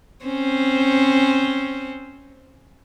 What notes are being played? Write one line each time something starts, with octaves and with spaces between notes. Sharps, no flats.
C4 C#4 C5